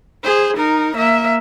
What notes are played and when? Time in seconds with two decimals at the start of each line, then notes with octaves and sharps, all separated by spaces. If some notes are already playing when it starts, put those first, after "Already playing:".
0.23 G#4 C5
0.57 D#4 A#4
0.96 A#3 E5